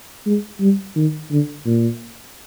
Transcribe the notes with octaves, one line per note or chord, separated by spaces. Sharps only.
G#3
G3
D#3
D3
A#2